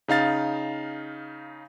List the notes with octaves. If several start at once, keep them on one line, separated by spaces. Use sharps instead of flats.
C#3 D#4 F5 A6